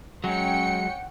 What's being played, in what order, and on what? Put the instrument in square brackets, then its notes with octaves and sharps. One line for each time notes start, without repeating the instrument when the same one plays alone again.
[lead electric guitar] F#3 G#3 [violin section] C#4 G5 C#7 [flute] F#5